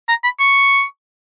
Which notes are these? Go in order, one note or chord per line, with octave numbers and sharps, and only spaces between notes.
A#5
B5
C#6